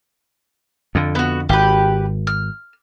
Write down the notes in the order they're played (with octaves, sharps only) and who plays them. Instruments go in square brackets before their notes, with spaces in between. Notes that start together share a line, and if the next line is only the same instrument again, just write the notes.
[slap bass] F2 D3
[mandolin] B3 F#4
[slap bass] G#1 [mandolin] G4 B4
[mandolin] F6